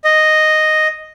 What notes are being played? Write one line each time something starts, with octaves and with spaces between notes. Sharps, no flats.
D#5